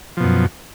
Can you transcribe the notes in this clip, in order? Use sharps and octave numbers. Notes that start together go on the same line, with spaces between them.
F#2 B2 F3